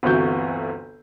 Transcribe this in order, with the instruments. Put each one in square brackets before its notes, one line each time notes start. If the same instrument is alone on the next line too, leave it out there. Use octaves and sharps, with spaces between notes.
[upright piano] G1 D2 C3 E3 F#4 G6